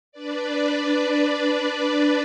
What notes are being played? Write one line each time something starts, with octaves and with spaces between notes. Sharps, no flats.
D4 B4 D5